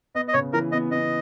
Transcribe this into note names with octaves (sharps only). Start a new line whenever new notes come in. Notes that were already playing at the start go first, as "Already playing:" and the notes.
B3 D#5
D#5
C#3 C#5
E3 A#4
B3 D#5
B3 D#5